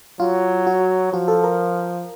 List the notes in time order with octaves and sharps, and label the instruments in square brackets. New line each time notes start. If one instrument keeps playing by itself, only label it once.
[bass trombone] F#3 [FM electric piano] F4
[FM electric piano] F#4
[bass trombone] F3 [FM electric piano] F#4
[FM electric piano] A4
A#4